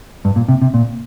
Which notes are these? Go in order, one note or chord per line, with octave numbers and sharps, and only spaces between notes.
G2
A#2
C3
C3
A#2